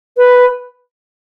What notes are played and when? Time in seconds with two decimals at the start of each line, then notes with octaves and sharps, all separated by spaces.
0.17 B4